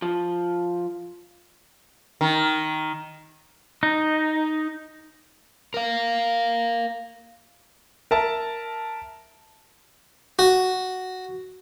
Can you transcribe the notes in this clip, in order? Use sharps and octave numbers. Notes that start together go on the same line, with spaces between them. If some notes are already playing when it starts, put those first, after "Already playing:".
F3
D#3
D#4
A#4 F5
A#4 E5 A5
F#4